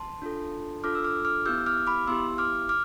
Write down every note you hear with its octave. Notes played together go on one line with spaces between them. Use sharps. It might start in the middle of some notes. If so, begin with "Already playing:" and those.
Already playing: A5 C6
D4 F4 A4
D4 F4 A4 D6 F6
E6
D6 F6
D6 F6
B3 E4 G4 E6 G6
D6 F6
B5 D6
B3 E4 G4 C6 E6
D6 F6
D6 F6